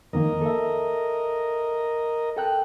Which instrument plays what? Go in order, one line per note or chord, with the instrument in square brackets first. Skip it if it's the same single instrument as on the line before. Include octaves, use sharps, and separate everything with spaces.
[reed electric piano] F2 D#3 A#3 [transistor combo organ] A#4 D#5
[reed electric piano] A4 E5
A4 G5 F#6